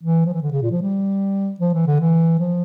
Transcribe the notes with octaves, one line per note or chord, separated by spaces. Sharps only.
E3
F3
E3
D3
C#3
A#2
F3
G3
F3
E3
D3
E3
F3